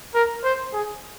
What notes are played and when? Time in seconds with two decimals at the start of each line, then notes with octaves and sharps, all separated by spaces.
0.15 A#4
0.44 C5
0.73 G#4